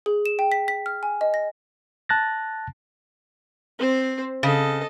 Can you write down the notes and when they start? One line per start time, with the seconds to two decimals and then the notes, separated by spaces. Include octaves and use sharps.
0.06 G#4
0.26 E7
0.39 G5
0.52 B6
0.68 B6
0.86 F6
1.03 G#5
1.21 D#5
1.34 A#6
2.09 A5 F#6 A6 A#6
3.79 C4 C5
4.43 C#3 A4 D#5